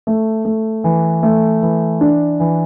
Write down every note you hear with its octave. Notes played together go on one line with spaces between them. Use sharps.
A3
A3
E3
A3
E3
D4
E3